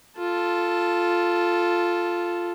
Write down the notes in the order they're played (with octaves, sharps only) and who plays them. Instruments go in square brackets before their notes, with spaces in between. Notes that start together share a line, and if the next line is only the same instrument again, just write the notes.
[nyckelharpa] F4 A4